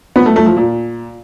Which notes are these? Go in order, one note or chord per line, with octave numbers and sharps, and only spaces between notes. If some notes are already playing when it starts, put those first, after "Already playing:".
B3
A3
A3
F3
A#2